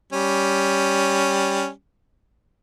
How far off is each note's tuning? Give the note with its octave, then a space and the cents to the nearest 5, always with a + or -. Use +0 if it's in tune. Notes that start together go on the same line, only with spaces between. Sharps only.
G3 +0 C#4 +0